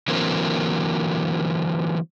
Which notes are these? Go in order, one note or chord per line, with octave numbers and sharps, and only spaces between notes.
D3 E3 F#3 A#3 C4